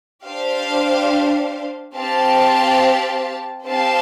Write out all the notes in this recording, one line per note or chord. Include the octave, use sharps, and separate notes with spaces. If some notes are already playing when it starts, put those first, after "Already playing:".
D4 G4 C5 F5
C4 G4 F5 A5
C4 G4 C5 F5 A5